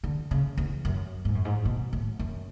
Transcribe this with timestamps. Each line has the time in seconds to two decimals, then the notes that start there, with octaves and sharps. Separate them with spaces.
0.04 D3
0.31 C#3
0.58 E2
0.85 F#2
1.25 G#2
1.35 F#2
1.45 G#2
1.65 B2
1.93 A2
2.19 F#2